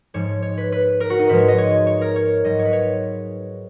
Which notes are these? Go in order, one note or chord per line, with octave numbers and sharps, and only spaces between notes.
G#2 F3 G#3 C#5
C#5
B4
B4
A#4
F#4
D#4
G#2 F3 G#3 B4
C#5
D#5
C#5
C#5
A#4
C#5
G#2 F#3 D#5
C#5
B4
C#5